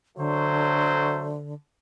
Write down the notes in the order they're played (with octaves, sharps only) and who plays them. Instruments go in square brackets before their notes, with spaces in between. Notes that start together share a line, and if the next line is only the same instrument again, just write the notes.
[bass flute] D3 [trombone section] F#3 A3 C5